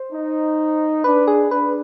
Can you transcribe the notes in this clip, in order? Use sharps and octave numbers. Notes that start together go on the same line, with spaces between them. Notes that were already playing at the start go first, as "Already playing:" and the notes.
Already playing: C5
D#4
D4 B4
G#4
D4 B4